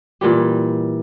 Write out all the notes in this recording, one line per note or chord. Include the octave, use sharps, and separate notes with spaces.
A#2 E3 G3 G4